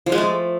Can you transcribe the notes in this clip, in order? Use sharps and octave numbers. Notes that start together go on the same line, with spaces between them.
F3
G#3
A3